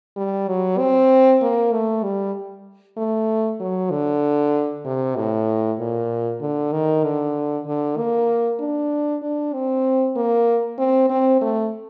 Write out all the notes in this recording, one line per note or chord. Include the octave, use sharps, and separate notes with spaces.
G3
F#3
C4
A#3
A3
G3
A3
F#3
D3
C3
A2
A#2
D3
D#3
D3
D3
A#3
D4
D4
C4
A#3
C4
C4
A3